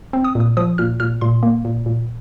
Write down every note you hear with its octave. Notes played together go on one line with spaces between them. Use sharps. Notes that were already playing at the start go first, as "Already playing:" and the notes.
C4
D#6
A#2 D#6
F3 D#6
A#2 F6
A#2 F6
A#2 C6
A#3
A#2
A#2